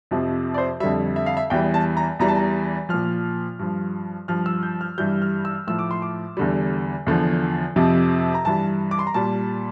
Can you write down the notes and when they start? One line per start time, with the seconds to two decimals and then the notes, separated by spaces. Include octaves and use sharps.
0.11 F2 C3 F3
0.54 D5
0.58 C5
0.80 F2 D3 G3 E5
1.16 E5
1.26 F5
1.37 E5
1.50 E2 E3 G3 G5
1.74 A5
1.97 A#5
2.19 E2 E3 G3 A#5
2.28 A5
2.36 A#5
2.89 A#2 F3 F6
3.59 G2 F3
4.28 G2 F3 F6
4.46 E6
4.63 G6
4.81 F6
4.98 G2 E3 G3 G6
5.22 F6
5.45 E6
5.67 A2 F3 E6
5.79 D6
5.91 C6
6.02 D6
6.37 E2 D3 G3
7.07 E2 D3 F3
7.76 F2 C3 F3
8.34 A#5
8.45 G2 E3 G3 A5
8.91 D6
8.99 C6
9.07 A#5
9.14 A#2 G3 A5